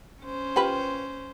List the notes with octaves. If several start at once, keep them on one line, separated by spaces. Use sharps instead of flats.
C#4 C5
F4 G4 B4